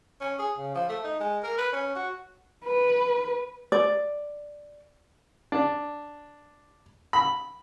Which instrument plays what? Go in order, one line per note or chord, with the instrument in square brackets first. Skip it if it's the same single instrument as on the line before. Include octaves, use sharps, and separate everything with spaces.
[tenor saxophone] C#4
G#4
C#3
F3
A3
D#4
G#3
A#4
B4
C#4
F#4
[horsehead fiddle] B4
[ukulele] D5
[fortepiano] D4
B5